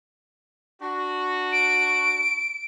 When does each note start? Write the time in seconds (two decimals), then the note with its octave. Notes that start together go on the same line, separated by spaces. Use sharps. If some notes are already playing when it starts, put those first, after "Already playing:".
0.81 D4 F#4
1.53 D7